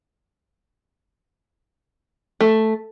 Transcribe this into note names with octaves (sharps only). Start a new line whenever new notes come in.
A3